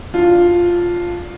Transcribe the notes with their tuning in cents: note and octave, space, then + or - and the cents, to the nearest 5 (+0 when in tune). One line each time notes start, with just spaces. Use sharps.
D4 +0 F4 +0